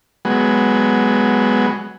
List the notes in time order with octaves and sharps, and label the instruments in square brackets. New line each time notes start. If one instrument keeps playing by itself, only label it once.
[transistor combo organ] F#3 G#3 B3